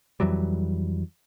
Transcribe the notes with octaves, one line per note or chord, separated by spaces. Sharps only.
F2 E3 F#3 G3